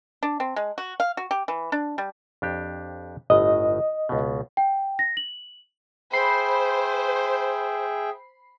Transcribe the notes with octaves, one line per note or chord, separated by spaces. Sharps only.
D4
C4
G#3
F#4
F5
F#4
G4
E3
D4
G3
F2 D4 G4
G1 A2 D#5
C#2 B2
G5
A#6
F#7
G#4 C5 E5 G5 B5 C7